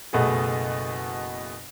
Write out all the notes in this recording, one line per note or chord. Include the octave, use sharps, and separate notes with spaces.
F#1 B2 A3 B3 G#4